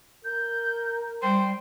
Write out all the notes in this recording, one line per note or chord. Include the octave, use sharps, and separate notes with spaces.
A#4 G6
G3 C5 G5